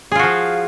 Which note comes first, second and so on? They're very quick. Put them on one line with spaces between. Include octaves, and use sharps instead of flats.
G#4 F4 F#4 F3